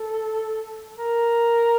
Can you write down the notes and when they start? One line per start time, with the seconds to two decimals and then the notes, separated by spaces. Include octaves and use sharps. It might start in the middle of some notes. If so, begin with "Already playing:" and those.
Already playing: A4
0.97 A#4